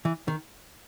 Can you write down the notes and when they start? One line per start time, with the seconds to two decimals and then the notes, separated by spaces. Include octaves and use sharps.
0.05 E3
0.28 D#3